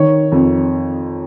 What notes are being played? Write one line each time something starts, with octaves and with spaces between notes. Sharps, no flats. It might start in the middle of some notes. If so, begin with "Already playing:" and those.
Already playing: D#3 C#5
F2